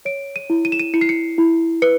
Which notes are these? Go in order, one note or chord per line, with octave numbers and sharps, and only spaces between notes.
C#5 D7
D#7
E4
D#7
E7
D#7
E4 C#7
C7
C#7
E4
B4 C#7